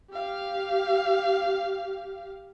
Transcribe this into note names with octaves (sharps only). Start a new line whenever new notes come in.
G4 F5